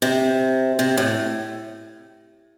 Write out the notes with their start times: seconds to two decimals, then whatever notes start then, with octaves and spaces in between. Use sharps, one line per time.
0.02 C3
0.79 C3
0.97 A2